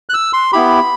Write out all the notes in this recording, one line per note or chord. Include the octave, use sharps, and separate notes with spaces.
F#6
E6
C6
B3 E4 G4 B5